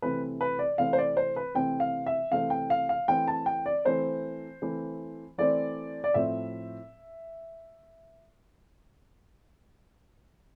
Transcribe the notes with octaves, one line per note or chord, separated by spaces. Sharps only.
C3 E3 A3 C4 B4
B4
D5
C3 E3 A3 C4 F5
C5
D5
C5
B4
C3 E3 A3 C4 G5
F5
E5
C3 E3 A3 C4 F5
G5
F5
F5
E3 A3 C4 G5
A5
G5
D5
E3 A3 C4 C5
E3 A3 C4
E3 A3 C4 D5
D5
A2 F3 A3 C4 E5